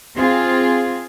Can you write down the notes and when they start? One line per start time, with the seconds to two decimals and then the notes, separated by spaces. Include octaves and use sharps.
0.16 C4 F4 G#4